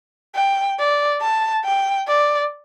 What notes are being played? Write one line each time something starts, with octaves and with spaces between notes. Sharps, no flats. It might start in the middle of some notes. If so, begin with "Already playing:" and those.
G5
D5
A5
G5
D5